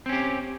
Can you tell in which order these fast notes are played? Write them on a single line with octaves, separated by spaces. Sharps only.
C4 C#4 G4